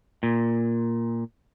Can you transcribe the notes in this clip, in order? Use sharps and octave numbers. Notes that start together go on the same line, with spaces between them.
A#2